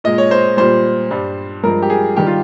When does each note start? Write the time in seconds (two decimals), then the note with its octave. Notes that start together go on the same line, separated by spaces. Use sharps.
0.04 A#2 G#3 D#5
0.18 C#5
0.31 C5
0.57 A#2 G3 C5
1.11 G2 G3
1.63 G2 F3 G#3 A#4
1.82 G4
1.90 G#4
2.16 G2 D#3 G3 G4
2.27 F4